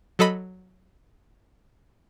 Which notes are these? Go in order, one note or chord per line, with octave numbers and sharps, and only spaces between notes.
F#3 A4 D#5 B5